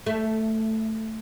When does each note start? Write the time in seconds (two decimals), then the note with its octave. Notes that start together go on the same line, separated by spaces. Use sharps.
0.06 A3